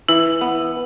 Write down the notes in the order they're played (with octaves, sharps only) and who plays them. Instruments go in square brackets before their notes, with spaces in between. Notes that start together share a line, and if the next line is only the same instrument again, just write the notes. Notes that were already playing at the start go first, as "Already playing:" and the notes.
[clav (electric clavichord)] E3 [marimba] E4
[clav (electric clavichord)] B3